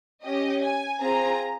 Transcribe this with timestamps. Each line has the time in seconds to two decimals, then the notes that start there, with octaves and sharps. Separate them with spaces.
0.23 C#4 G4 D#5
0.62 G#5
1.00 C4 F4 G#4 A#5